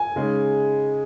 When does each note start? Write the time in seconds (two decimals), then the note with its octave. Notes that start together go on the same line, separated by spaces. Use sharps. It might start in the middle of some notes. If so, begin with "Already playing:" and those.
Already playing: G#5
0.16 C#3 G#3 D#4